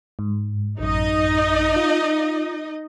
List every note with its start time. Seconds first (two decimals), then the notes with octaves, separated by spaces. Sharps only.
0.19 G#2
0.79 A1 F#2 D#4 D#5
1.76 F4